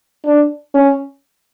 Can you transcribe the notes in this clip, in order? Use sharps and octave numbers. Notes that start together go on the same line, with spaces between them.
D4
C#4